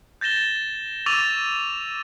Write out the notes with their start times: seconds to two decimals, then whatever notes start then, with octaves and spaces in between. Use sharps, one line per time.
0.21 G6 A6 A#6 E7 G7
1.06 C#6 D6 E6 A6 D#7 F7